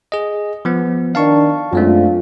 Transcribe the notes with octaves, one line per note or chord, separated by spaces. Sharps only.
G#4 D#5
F3 B3
D#3 D4 F5 A5 C#6
F#2 G#3 A3 C4 D4 F4